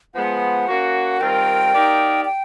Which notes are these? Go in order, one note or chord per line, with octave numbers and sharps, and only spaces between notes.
F3 G#3 B3 F#5
A#3 C#4 F#4
D#3 G3 C4 F4 A#4 G5
A#3 D#4 G4 A#4 D5
G5